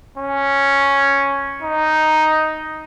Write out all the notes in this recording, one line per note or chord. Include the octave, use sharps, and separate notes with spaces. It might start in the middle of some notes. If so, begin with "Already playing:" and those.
C#4
D#4